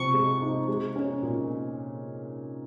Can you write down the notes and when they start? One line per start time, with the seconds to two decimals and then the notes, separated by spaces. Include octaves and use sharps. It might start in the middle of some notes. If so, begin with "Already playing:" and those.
Already playing: C3 F3 C#6
0.14 G#3
0.42 D#4
0.68 G#3
0.96 C#4
1.22 A#2